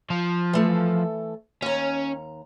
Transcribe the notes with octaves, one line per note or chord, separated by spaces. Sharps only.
F3
E3 A3 A4
D#2 C#4 A#5